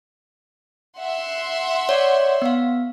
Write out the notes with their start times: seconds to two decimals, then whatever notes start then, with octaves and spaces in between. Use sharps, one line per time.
0.98 E5 F#5 C6
1.89 C#5 D5
2.42 B3 F5